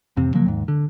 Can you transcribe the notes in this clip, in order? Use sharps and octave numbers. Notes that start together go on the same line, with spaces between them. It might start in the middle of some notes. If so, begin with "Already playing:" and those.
A1 F2 C3 C4
C#3 F3 F#3 A#3
D#2 G#2
D3